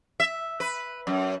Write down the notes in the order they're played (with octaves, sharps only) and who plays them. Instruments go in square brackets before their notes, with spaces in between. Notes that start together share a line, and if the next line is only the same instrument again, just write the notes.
[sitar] E5
B4
F#2